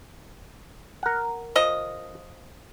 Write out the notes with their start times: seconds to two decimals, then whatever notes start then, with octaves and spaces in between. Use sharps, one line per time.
1.03 A#4 F#5
1.56 F3 D#5